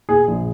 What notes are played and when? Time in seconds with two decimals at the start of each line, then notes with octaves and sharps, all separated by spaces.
0.09 A#2 G#4
0.28 A#1